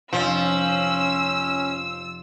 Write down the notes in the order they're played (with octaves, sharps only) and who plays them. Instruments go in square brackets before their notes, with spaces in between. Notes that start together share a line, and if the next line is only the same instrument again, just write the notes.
[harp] F1 [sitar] F3 [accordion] C#4 [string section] E6